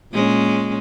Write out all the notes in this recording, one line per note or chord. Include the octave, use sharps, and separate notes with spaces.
A#2 G#3 C#4